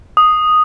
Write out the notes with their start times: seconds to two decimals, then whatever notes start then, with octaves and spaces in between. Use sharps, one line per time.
0.17 D#6